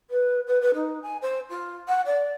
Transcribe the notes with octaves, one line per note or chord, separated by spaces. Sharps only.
B4
B4
B4
D#4
G#5
C5
F4
F#5
D5